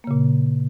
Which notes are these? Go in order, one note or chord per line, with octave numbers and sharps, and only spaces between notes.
A#2 C#3 A#3